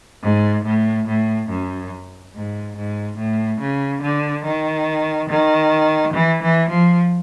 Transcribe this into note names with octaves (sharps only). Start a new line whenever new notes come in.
G#2
A2
A2
F#2
G#2
G#2
A2
C#3
D3
D#3
D#3
E3
E3
F3